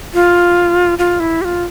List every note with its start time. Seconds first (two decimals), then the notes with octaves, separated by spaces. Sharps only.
0.14 F4
0.98 F4
1.20 E4
1.41 G4
1.45 F4